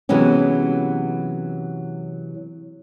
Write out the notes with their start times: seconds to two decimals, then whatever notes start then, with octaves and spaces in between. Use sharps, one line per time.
0.09 C3 E3 F#3 G#3 B3 C#4